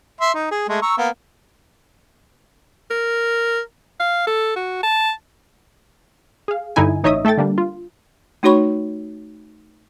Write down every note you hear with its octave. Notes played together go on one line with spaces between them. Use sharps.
E5 C6
D#4
G#4
G#3 A3
A#5 C#6 E6
A#3 B3
A#4
F5
A4
F#4
A5
G#4 F5
G2 D3 D#4 E4 G#5
A1 D#4 C#5 D#5 E5 D#6
A3 A4 E5 G5 A6
D3 G3 A#3 D4
F4
A3 D#4 F#4 C#5 B5 C#6